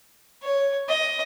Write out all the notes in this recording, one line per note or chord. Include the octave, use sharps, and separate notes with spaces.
C#5
D#5